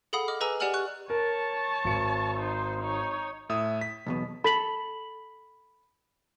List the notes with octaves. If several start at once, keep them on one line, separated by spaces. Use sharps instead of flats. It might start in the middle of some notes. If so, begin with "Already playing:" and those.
G#4 A4 F5 F#5 B5 D#6
D#5 D6 F6
G#4 B4 D#5 G#5 A#5 E6
G4 D5 F#5 G#5 F6 F#7
C#6 F#6
A#4 C#5 A5
G#1 C#7
D#4 C5
D#4 C#5
A2 E5 D#6
B6
B1 E2 B2
A4 B5 B6 F#7